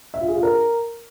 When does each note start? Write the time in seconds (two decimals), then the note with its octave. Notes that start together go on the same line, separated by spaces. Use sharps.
0.14 E5
0.21 F4
0.28 G#4
0.36 F4
0.43 A#4